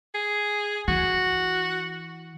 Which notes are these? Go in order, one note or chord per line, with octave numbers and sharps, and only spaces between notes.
G#4
E3 F#4